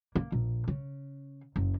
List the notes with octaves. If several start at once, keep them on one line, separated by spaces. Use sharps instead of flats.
A#3
A#1
C#3
F#1